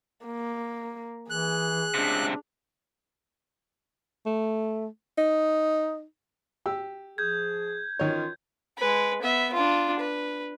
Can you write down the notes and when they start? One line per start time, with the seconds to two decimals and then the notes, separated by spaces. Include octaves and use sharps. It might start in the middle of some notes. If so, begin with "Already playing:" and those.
0.25 A#3
1.30 E3 G#4 F#6
1.94 C#2 C3 D4
4.26 A3
5.18 D#4
6.66 G4 E6
7.18 F3 G#4 G6 G#6
8.00 D#3 E3 C#4 F4 C#5
8.78 G#3 B4
9.22 B3 E5
9.53 D4 F4
10.00 B4